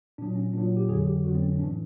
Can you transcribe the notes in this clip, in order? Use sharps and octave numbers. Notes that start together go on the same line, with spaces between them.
A#2 F#3 D4
C#4
A#2 F#3 D4
G4
F2 D3 F#3 G#4
G4
F2 D3 F#3 F#4
C4
C#4
C#4
A2 E3 D4